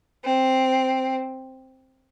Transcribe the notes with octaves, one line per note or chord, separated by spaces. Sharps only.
C4